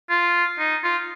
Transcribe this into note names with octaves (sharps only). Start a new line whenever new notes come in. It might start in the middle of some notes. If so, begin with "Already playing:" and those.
F4
D#4
F4